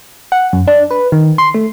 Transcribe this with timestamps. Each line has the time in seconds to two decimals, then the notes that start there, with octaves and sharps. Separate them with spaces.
0.32 F#5
0.53 F#2
0.68 D4
0.91 B4
1.12 D#3
1.38 C6
1.54 A3